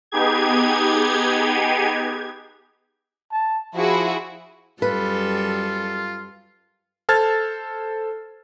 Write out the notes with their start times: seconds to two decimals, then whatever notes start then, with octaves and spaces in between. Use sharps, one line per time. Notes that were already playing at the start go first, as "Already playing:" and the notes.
0.12 B3 D#4 G4 G#4 G#6
3.32 A5
3.75 F3 E4 F#4 G#4
4.82 F#2 G3 F4 A4 B4
7.09 A4 C5 A5 F6 G#6 A6